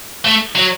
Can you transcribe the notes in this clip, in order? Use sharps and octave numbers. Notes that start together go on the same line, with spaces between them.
A3
F#3